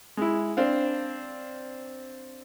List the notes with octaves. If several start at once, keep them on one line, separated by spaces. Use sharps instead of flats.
G#3 E4
C4 D4 F5